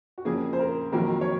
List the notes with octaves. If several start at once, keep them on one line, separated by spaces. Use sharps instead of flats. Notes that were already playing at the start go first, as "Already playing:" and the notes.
F#4
F2 C#3 F3 A#3 G#4
C5
A#4
F2 D#3 F#3 A#3 A#4
C#5